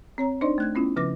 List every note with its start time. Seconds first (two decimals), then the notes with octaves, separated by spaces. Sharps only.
0.18 C4 C#5 A#5
0.41 D4 D#4 C5 D5 D#5 C6
0.58 A3 F#6 G#6
0.75 B3 C#4 E4 F4
0.96 C#3 F3 B4 D6 A#6